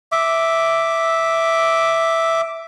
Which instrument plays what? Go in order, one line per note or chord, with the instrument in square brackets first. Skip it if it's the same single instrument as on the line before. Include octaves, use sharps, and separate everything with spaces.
[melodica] E5 D6